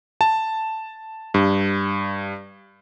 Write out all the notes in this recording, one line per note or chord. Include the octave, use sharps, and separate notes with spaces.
A5
G2